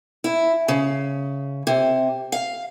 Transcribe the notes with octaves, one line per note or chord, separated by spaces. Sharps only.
E4
C#3
C3
F5